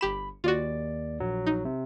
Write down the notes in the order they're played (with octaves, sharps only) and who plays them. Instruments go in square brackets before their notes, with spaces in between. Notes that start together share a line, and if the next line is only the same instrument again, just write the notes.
[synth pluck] G1 G4 E7 [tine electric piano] B5
[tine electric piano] D#2 D5 [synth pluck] F4 F#4
[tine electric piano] A#1 F#3
[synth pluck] D#4
[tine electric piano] C3